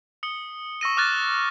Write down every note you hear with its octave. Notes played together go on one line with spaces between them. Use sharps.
D#6 C#7 G7
C#6 E6 A#6 D#7
D6 F6 F#6 A6